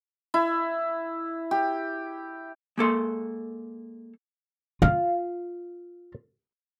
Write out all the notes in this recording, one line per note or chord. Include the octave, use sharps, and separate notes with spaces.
E4
G4
G#3 A#3 A4 C6
F4 F5